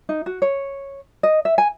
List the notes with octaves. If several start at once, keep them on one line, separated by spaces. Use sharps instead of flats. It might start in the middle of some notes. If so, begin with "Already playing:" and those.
D#4
F#4
C#5
D#5
E5
G#5